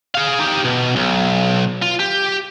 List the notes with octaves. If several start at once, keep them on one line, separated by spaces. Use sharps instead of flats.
G#4 F5
D#4 G4
B2
B1
F4
G4